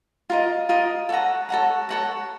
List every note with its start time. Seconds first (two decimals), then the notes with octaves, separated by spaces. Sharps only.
0.30 F4 A#4 D#5
0.69 F4 A#4 D#5
1.09 A4 C#5 F#5 A#5
1.49 A4 C#5 F#5 A#5
1.89 A4 C#5 F#5 A#5